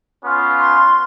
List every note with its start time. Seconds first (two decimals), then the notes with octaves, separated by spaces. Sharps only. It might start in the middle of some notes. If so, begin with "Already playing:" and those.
0.25 B3 C#4 F4
0.59 C6